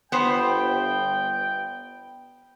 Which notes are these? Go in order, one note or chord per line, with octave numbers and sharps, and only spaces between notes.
G1 B3 C5 G5